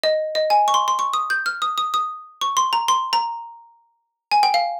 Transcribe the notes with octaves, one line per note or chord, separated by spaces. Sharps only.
D#5
D#5
G#5
C#6
C6
C6
C#6
D#6
G6
F6
D#6
D#6
D#6
C#6
C6
A#5
C6
A#5
G#5
G5
F5